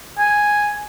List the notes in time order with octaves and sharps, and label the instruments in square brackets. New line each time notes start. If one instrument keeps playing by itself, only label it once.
[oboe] G#5